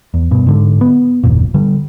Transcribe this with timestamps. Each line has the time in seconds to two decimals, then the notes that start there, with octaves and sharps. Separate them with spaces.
0.14 E2
0.31 G2 B2
0.47 G#2 D3
0.81 B3
1.23 F#1 D#2 A#2
1.54 D3 G3